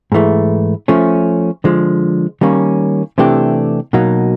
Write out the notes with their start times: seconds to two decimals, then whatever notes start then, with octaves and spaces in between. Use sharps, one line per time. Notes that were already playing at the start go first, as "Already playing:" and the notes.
0.12 G#2 E3 A3
0.88 F3 A3 C#4
1.64 D3 F3 G#3
2.41 D#3 G3 A#3 C#4
3.18 C3 E3 A3 D4 G4
3.93 B2 F#3 A#3 D#4